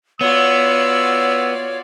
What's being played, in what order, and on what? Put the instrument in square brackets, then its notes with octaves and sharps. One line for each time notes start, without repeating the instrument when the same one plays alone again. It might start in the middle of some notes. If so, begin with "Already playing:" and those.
[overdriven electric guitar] B3 [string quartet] F4 F#4 D5 [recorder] C#5 [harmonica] E6